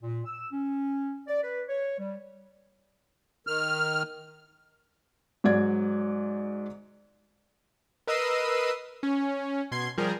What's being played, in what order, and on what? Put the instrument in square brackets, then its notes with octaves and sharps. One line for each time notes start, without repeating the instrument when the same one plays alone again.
[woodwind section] A#2
E6
C#4
D5
B4
C#5
G3
[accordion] D#3 F6
[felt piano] G#2 F#3 D5 G#6
[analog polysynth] A#4 B4 D#5 E6 C7 D#7
C#4
B2 C6 G#6 C7
F3 G3 G#4 A#4